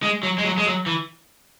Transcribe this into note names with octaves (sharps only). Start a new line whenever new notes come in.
G#3
F#3
G#3
F#3
G#3
F#3
E3